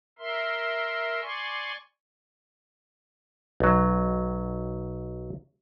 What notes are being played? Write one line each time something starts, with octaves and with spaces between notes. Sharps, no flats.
A#4 E5 C6
D5 G#5 C6 C#6
B1 F#3